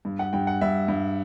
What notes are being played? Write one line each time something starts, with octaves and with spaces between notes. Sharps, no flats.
G2
F#5
G2 G5
F#5
G2 E5
G2